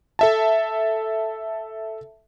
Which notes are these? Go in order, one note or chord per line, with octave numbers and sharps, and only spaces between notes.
A4 E5 A5